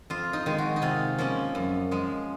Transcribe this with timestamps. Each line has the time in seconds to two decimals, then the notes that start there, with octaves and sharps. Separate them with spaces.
0.10 F2 F4
0.33 D#4
0.46 D#3 G#3
0.58 F#4
0.76 D#4
0.82 C3 F4
1.18 F3 A#3 C#4
1.55 F#2
1.91 F3 G#3